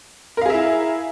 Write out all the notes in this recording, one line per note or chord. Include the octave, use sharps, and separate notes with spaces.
E4 G#4 A#4 E5 F5